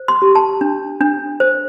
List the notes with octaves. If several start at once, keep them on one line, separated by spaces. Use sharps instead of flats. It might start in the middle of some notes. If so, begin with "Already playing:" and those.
Already playing: C5
C6
G4
A5
D4
D4
C5